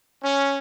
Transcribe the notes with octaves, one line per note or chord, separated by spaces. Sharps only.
C#4